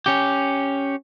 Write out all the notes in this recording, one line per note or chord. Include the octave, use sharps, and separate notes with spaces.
C#4 G4